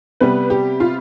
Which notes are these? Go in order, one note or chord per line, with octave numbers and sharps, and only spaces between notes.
C3 G3 B3 B4
G4
F4